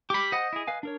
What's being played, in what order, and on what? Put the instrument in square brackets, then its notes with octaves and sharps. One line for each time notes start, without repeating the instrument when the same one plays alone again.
[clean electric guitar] G4 B5 [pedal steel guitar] D6
[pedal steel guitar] C5 F#5 [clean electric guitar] D#5
[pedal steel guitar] E4 G#4
B4 F5 G#5
D4 A#4 C#5